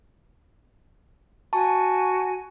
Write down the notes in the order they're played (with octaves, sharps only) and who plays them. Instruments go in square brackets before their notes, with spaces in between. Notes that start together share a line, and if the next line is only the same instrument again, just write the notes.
[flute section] F#4 G#5 [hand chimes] A5 C#6